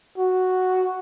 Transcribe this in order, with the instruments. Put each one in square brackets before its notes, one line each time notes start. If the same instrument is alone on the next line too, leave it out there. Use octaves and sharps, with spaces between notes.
[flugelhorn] F#4